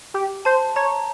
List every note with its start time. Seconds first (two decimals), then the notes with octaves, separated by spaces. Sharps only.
0.14 G4
0.45 C5 A5
0.76 C#5 A#5